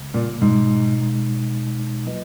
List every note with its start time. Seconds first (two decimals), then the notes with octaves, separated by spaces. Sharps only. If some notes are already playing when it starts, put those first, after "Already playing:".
Already playing: C#2 C#3 G#3
0.14 A#2
0.41 G#2 B2 G#3 D#4
2.06 F#3 A#3 F4 B4 D#5